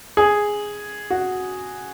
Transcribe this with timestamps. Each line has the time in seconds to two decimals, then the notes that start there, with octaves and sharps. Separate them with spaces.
0.17 G#4
1.10 F#4